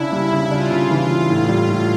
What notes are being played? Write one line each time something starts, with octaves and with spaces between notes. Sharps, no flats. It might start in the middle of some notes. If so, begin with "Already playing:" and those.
Already playing: C#3 D4 E4
G3
C#3
D4 F4
C#3
E3 F4
E3
A2
G3
A2